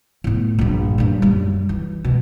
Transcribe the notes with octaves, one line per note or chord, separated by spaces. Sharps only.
A2 B3
A#1 G2
G2 A#2
F#2 G3
E3
B2